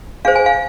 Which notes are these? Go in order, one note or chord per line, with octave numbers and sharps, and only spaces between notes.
D4 G#4 C5 F5
G#5
F5